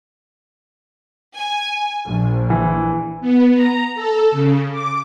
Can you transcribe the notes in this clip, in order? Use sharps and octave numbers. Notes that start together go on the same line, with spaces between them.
G#5
A#1
E3
B3
A#5
A4
C#3
D6